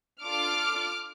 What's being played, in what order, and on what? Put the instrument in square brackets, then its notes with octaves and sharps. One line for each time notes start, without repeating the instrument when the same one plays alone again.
[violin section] D4 F4 A4 D6 F6